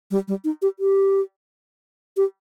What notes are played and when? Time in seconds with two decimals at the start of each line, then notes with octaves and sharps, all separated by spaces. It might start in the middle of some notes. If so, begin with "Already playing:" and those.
0.11 G3
0.28 G3
0.44 D#4
0.62 G4
0.79 G4
2.17 G4